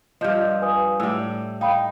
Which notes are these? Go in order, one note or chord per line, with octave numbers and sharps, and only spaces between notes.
G2 F3 D#5 G6
B4 G#5 D#6
A2 G3 E6
D#4 F5 G5 B5